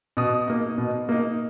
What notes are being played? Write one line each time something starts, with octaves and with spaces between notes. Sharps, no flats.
B2 D#6
A#3 D#4
B2
A#3 D#4